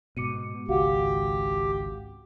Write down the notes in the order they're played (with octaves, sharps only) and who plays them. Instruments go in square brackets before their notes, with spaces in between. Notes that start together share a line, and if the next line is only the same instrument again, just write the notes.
[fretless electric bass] G#2 B2 [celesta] D6 C#7 D#7
[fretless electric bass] G#1 C#2 [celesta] F#4 F5 F#5 [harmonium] G4